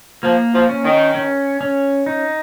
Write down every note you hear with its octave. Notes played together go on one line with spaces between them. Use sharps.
F3 A#3
F3
C#4
D#3
C#4
C#4
D#4